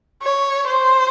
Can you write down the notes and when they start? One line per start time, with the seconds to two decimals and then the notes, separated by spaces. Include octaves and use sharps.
0.23 C#5
0.68 C5